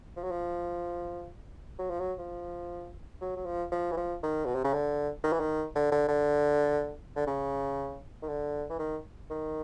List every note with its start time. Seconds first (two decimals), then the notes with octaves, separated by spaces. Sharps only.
0.16 F3
0.23 F#3
0.31 F3
1.79 F#3
1.90 F3
2.00 F#3
2.19 F3
3.21 F#3
3.37 F#3
3.46 F3
3.72 F3
3.92 E3
3.97 F3
4.23 D#3
4.45 B2
4.55 C3
4.64 C#3
4.73 D3
5.24 D#3
5.32 E3
5.40 D#3
5.75 D3
5.92 D3
6.08 D3
7.16 D3
7.27 C#3
8.22 D#3
8.29 D3
8.70 E3
8.79 D#3
9.30 D#3